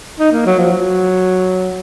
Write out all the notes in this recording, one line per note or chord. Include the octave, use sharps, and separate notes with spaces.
D#4
A#3
F#3
F3
F#3